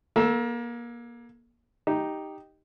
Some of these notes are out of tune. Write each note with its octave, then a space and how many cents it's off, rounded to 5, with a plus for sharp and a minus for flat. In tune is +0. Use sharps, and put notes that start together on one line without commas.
A#3 +30 A4 +0
D#4 +0 G4 +0